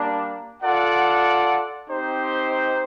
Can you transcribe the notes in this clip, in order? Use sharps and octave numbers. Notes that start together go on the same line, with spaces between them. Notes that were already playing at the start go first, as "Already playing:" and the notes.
Already playing: G3 A#3 D4
F4 A4 D5 F#5
C4 D#4 G4 C5